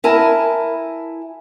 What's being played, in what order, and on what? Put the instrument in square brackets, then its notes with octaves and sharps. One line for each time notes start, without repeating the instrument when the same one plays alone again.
[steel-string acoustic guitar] E4 A#4 G#5 A5